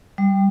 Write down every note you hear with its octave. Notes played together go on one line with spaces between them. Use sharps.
G3